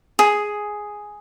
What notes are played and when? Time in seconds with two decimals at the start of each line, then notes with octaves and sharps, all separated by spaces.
0.19 G#4